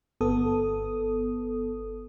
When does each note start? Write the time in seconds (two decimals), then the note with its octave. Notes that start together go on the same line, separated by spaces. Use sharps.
0.21 G1 B3 A4 D#6